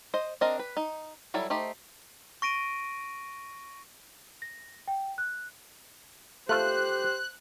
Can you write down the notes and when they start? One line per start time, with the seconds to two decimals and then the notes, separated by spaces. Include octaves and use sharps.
0.14 C5 D#5
0.41 C4 D4 A#4 D#5
0.59 B4
0.77 D#4
1.34 F#3 G3 E4 A4
1.50 A3 D#4 G4 C5
2.42 C#6 A#6 D7 D#7
4.42 A#6
4.88 G5
5.18 F#6
6.49 A3 F4 G4 C5 F#6